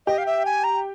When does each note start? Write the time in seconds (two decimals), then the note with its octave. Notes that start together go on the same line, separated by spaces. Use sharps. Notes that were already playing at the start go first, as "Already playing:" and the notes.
0.07 G4 D#5
0.18 F5
0.26 E5
0.45 G#5
0.64 A#5